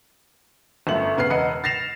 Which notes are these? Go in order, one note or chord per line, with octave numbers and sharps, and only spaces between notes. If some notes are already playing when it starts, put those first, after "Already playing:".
G1 F#2 A3 F#7
C#3 B3 F6 C7
E1 B4 D#5 F#5 C#7
A6 A#6 C7 E7 F7